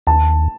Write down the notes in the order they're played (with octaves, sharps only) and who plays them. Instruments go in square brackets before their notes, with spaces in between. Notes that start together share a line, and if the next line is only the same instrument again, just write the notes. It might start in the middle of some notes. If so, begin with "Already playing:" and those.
[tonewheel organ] D#2 [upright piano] A5